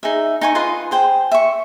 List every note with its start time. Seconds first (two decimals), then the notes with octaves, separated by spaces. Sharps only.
0.03 D#4 G#4 E5
0.41 D#4 G#5 C#6
0.55 F4 B4 D#5 C6
0.91 G#4 C5 G5
1.31 E5 C#6